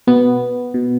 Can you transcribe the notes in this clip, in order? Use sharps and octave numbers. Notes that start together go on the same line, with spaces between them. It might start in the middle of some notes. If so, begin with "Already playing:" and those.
B2 B3
B2